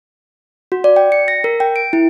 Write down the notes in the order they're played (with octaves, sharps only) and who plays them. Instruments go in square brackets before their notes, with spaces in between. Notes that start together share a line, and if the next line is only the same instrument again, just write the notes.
[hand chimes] F#4
D5
G5
C#7
A#6
A#4
G5
D7
E4